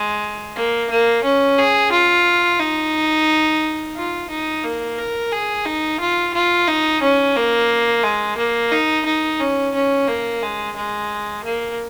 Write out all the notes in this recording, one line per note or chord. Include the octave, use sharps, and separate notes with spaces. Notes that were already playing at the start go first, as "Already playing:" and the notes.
Already playing: G#3
A#3
A#3
C#4
G#4
F4
D#4
F4
D#4
A#3
A#4
G#4
D#4
F4
F4
D#4
C#4
A#3
G#3
A#3
D#4
D#4
C#4
C#4
A#3
G#3
G#3
A#3